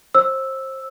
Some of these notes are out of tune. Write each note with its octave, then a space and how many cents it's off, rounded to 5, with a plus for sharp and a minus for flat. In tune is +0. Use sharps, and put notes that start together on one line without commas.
C5 +25 E6 +0